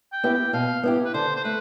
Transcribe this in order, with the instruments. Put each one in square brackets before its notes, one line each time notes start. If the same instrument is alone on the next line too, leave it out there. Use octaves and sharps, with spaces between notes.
[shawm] G5
[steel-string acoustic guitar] B3 E4 G4
[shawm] G5
[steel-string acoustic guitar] B2 [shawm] F5
[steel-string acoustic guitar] B3 E4 G4
[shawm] B4
[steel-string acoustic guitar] D3 [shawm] C5
[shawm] C5
[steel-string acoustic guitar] A3 [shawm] B4